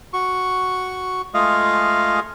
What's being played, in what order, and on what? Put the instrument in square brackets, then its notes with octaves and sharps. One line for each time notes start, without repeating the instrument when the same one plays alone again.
[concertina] F#4 C#6
G#3 A3 F4 G#4 D#5 F5